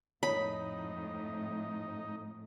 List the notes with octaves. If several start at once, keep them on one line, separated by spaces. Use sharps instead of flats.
F2 A2 D#4 C#5 B5